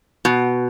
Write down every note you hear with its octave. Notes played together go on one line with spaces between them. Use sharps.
B2